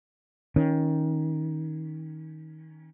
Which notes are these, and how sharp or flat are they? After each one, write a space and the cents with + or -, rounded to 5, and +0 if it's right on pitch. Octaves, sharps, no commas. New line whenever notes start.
D#3 +20 C#4 +0